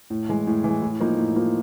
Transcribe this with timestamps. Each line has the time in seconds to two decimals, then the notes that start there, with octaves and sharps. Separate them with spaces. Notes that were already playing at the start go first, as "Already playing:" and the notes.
0.10 A2
0.29 E3 G#3
0.47 A2
0.64 E3 G#3
0.82 A2
1.00 F3 A#3 D#4
1.19 A2
1.36 F3 A#3 D#4